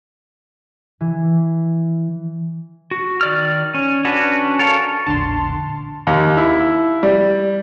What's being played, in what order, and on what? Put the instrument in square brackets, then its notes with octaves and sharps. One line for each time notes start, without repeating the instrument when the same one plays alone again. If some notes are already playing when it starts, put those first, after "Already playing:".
[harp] E3
[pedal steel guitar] F#4
D#3 D5 F6
C#4
C#4 D4 F#4 B4
A4 A#4 C#5 F5
[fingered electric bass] E1 A#1 A2 [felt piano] D3 [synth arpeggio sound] A5 C6
[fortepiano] D#2
E4
G3